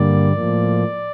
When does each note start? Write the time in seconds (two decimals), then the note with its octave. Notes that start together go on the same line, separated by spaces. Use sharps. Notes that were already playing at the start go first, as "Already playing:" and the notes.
Already playing: G2 D3 G3 A#3 D5
0.32 A2 F3 A#3